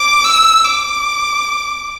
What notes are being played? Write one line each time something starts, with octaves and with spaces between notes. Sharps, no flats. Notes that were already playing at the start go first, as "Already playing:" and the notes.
Already playing: D6
E6
D6